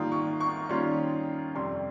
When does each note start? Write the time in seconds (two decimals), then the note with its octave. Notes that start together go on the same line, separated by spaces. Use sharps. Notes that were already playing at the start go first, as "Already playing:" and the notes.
Already playing: G#2 D#3 G3 A#3 F4 D#6
0.12 C#6
0.40 C#6
0.69 D#3 G3 A#3 C#4 F4 C6
1.55 F2 C3 G3 C6